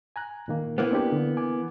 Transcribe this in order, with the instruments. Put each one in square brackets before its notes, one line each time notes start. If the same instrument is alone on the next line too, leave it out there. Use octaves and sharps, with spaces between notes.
[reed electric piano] G#5 A#5 F#6
A#2 D#3 A#3
[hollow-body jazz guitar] E3 A#3 B3
[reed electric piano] C4 D4 G4
D3
G#5 D6